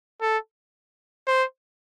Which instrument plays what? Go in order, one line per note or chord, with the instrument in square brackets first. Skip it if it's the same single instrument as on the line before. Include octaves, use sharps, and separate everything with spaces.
[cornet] A4
C5